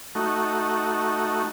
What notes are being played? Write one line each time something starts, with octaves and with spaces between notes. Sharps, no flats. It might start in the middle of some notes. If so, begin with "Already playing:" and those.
A3 D#4 F#4